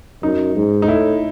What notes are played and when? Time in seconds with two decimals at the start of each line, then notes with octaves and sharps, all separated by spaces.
0.23 F#2 D#4
0.56 G#2
0.82 D#4
0.87 A2 E4